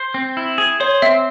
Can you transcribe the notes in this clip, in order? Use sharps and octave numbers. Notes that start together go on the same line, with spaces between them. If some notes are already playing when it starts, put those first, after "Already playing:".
Already playing: C5
C4
E4
G#4
C5 C#5
C4 E5